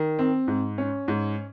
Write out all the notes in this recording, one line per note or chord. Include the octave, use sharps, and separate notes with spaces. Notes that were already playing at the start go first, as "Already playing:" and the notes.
Already playing: D#3
C4
G#2
C#4
G#2